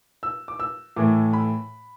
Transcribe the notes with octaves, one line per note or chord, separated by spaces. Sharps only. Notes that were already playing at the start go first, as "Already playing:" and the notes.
E6
D6
E6
A2 E3 A3 D6
B5